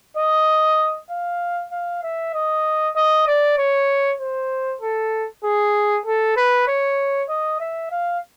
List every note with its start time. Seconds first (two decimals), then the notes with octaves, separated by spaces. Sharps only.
0.17 D#5
1.11 F5
1.72 F5
2.03 E5
2.34 D#5
2.96 D#5
3.27 D5
3.58 C#5
4.20 C5
4.81 A4
5.44 G#4
6.06 A4
6.37 B4
6.68 C#5
7.29 D#5
7.60 E5
7.91 F5